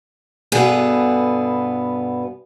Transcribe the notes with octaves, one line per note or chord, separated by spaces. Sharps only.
G2 B2 B3 G#4 A4